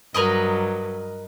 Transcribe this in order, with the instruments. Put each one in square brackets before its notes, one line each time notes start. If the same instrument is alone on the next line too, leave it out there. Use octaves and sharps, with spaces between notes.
[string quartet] G2 F#3 [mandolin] A#4 B4 D#5